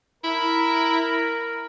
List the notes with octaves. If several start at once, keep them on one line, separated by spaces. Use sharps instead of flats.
E4 A#4